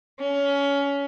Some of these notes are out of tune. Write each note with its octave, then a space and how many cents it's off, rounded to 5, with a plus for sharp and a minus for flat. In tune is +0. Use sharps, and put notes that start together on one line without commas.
C#4 +20